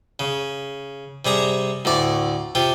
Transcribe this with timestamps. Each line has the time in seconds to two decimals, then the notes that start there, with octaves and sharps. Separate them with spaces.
0.19 C#3
1.25 C3 G3 G#4 A#5
1.85 D2 A2 D5
2.55 C3 C4 F4